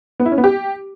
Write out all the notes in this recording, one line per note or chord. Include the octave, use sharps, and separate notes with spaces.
B3
E4
C#4
B3
G4